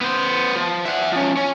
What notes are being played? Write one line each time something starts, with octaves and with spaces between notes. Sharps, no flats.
B3 C5
F3
E5 F#5
F3 C#4
C#4